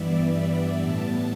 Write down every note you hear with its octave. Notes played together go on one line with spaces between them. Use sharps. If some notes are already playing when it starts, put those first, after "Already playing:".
Already playing: G2 E3 G3 B3 D5 E5
E5
A2 G3 B3 A5